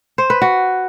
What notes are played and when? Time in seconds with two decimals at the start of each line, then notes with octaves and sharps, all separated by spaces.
0.18 C5
0.30 B4
0.42 F#4